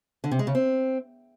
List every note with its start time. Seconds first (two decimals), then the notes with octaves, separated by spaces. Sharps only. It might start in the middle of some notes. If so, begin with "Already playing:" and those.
0.24 D3
0.31 C3
0.39 G#3
0.47 C#3
0.55 C4